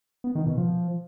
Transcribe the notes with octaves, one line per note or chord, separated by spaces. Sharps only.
B3
D#3
B2
F3